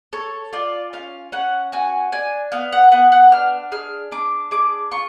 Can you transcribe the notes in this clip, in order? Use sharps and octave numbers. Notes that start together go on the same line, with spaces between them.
A4 C#5
F4 D5
C#4 F5
C#4 F#5
F#4 G#5
D4 G#5
B3 F5
F#5
B3 F#5
F#5
D4 F6
G#4 F6
D4 D6
G#4 D6
F4 C#6